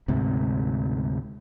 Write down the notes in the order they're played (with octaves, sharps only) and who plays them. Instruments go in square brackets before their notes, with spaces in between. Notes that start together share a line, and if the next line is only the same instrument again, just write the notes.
[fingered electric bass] D2 G#2 C3